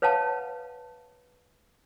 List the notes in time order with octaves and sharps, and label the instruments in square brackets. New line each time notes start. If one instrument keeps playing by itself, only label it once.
[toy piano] B4 C#5 F5 F#5 A5